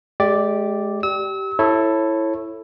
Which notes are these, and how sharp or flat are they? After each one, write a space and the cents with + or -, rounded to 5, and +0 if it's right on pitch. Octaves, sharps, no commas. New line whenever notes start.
G#3 +30 G4 +0 D5 +0
G4 -15 E6 -35
E4 +0 A4 +5 C#5 -20